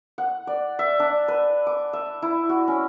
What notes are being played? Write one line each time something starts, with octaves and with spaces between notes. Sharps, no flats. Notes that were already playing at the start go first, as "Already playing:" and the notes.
F#5
D5
E5
D4
B4
D6
E5
E4
F#4
C#4